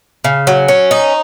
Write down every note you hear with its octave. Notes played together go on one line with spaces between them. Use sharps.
C#3
F#3
C#4
D#4